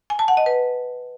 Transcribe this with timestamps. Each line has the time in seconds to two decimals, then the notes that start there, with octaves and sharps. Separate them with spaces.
0.10 G#5
0.19 A5
0.28 F#5
0.37 D#5
0.46 B4